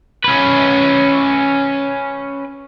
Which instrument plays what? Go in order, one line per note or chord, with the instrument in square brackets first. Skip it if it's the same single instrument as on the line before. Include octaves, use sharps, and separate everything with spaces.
[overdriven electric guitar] C#4 B4